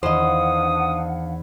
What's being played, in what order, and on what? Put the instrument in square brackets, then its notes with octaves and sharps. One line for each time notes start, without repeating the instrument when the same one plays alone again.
[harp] E2 D#3 [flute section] D4 F5 F#5 [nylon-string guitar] C5 D#5 [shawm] D#6